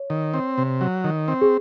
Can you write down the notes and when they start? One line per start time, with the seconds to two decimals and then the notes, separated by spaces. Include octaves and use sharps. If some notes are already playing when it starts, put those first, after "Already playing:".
Already playing: C#5
0.10 D#3
0.34 C4
0.58 C3
0.81 F#3
1.04 D#3
1.28 C4
1.41 G#4